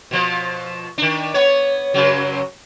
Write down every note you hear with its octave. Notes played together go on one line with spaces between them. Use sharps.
B2 F3
D#3 D4
B3 C#5
F#2 C#3 F#3